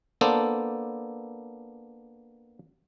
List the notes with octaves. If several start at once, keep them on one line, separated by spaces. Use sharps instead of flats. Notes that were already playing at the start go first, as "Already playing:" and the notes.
A#3 B3 D4 A4 C5